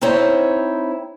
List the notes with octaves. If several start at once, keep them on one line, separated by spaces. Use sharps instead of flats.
C4 D#4 E4 C5 C#5